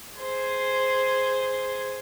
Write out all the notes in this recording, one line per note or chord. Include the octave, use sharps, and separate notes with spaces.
G#4 C5